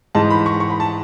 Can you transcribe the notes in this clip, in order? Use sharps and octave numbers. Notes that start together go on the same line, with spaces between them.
G#2 E3 G#3 D#4 A5
B5
C#6
C#6
B5
A5